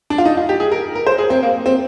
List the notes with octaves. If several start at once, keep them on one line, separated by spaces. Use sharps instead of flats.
D4
F4
D#4
F4
G4
G#4
A#4
A#4
C5
G#4
C4
A#3
C4